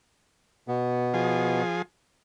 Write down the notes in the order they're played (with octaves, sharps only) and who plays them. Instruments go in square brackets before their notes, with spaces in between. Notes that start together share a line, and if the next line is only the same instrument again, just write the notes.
[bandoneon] B2 B3
[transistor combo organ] F3 G#4